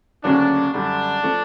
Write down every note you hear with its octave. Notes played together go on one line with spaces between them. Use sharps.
D2 C#3 F#3 A#3 C#4 D4
F#2 D3 G3 D4
F3 A3